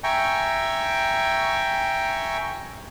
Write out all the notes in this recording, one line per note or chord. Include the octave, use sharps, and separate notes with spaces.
E5 G5 G#5 A#5 C#6